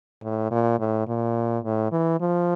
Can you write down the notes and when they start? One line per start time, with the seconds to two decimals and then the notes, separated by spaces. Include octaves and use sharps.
0.22 A2
0.51 A#2
0.79 A2
1.07 A#2
1.64 A2
1.92 E3
2.20 F3